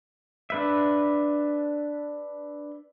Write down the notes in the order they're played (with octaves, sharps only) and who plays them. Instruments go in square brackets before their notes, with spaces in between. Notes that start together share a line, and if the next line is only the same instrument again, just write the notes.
[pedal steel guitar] D4 B4 E5